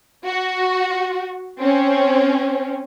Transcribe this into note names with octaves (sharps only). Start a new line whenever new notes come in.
F#4
C4 C#4